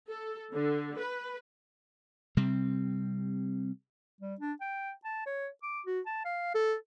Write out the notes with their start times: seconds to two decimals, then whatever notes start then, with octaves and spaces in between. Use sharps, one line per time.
0.10 A4
0.53 D3
0.98 B4
2.37 C3 G3 C4
4.21 G3
4.40 D4
4.61 G5
5.05 A5
5.26 C#5
5.63 D6
5.86 F#4
6.06 A5
6.25 F5
6.55 A4